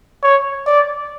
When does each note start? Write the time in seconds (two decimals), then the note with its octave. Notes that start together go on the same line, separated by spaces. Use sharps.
0.23 C#5
0.66 D5